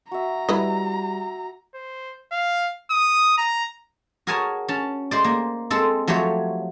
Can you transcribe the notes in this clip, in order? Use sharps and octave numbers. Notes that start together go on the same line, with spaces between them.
F#4 E5 A#5
G3 E4 B4 D#5
C5
F5
D#6
A#5
F#4 G#4 A#4 C#5 G#5 A5
C#4 A5
G#3 C5 D5
A#3
G#3 C4 A4
F3 F#3 A3 G4 C#5